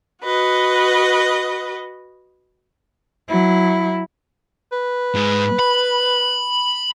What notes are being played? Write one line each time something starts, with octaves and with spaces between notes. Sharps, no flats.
F#4 B4 D#5
F#3 E4
B4
G#2 G#4
B5